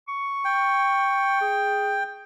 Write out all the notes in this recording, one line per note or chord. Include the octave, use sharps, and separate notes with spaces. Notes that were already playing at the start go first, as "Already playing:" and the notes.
C#6
G5
G#4